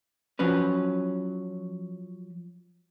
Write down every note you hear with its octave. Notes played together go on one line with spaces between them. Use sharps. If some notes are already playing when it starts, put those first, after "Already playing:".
F3 F#3 C#4 B4